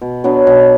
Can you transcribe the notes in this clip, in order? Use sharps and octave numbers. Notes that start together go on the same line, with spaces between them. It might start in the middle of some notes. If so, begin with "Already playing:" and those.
B2
F#3 B3 D4
B2